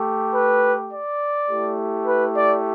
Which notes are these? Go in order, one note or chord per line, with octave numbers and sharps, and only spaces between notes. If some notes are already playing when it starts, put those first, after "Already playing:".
Already playing: A3 G4
B4
D5
A3 E4 G4
B4
D5